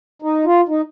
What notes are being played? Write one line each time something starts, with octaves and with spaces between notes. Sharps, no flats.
D#4
F4
D#4